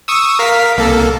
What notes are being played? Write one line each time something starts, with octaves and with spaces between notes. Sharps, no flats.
C#6 D#6 E6
A#4 F5 B6
C2 A#3 A4